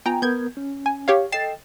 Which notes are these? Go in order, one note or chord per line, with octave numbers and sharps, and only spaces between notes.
B3 F4 G5 G#5 A#5
B3 A#4 G6 G#6
C#4
G#5
G4 C#5 F5
A4 D#5 G5 A6 C7 E7